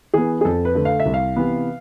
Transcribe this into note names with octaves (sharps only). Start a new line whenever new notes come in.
E3 B3 G#4
G#4
F2 A4
B4
D3 A3
F5
E5
C2
F5
C3 E3 B3